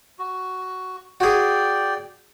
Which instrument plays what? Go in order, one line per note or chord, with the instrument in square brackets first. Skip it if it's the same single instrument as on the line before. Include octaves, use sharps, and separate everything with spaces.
[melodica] F#4
[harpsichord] F#4 G#4 [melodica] D5 G5